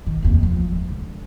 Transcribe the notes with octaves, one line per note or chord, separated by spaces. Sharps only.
D#3
F1 D#2
F3
G#3
D3